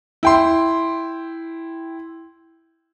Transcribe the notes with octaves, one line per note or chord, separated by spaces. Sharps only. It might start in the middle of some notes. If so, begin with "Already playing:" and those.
E4 G5 C6